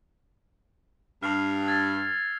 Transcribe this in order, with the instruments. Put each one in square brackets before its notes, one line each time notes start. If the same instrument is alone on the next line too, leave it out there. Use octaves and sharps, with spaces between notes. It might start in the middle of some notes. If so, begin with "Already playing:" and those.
[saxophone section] G2 [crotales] F6 C7 F7
[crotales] E6 G#6 A6